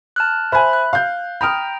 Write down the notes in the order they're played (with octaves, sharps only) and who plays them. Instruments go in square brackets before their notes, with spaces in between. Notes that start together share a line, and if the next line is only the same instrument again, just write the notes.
[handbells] A5 F6 F#6
[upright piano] C5 G#5 [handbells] E5 B5 F#6
[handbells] F#6
[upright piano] F5 G6
[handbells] G5 A#5 G6 [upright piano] B5 D#6 F6